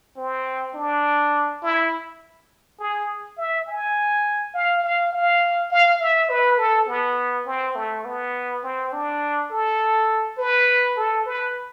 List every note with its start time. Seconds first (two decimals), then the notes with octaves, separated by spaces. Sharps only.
0.17 C4
0.75 D4
1.63 E4
2.79 G#4
3.38 E5
3.67 G#5
4.54 F5
4.84 F5
5.13 F5
5.71 F5
6.00 E5
6.30 B4
6.59 A4
6.88 B3
7.46 C4
7.76 A3
8.05 B3
8.63 C4
8.93 D4
9.51 A4
10.38 B4
10.97 A4
11.26 B4